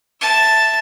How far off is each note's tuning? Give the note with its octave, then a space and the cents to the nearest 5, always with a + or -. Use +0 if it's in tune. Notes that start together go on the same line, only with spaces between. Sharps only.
E5 +0 A5 +0